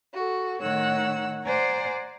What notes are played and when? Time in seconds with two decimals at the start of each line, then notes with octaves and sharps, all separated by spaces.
0.13 F#4 A4
0.61 A2 D#3 C#5 F#5 E6
1.44 C5 D5 F#5 G#5 A#5